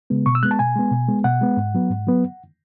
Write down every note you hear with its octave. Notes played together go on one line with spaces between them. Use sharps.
C#3 G#3 B3
B2 C#6
E6
G#3 B3 F#6
A5
B2 G#5
G#3 B3
B2
G#3 B3
B2 F#5
G#3 B3
G#2
F#3 B3
G#2
F#3 B3